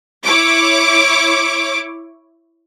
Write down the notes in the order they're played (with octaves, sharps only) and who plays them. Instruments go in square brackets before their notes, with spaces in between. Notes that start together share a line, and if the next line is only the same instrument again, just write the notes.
[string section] E4 C#5 D6